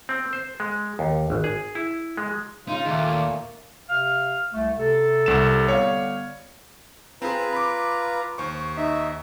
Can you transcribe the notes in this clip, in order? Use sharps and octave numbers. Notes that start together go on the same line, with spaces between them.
C4
C5
G#3
D#2
G#1
G#4
E4
G#3
C#3 D#4 F4
D#2 A#2 A3 A#3
C3 F5 F6
C2 A3
C3 A4
C2 E7
D3 G3 B3 C#5 F5
C4 F4 G#4 B4 A#5
B5 D6
D#2 C5 C#6
D#4 E5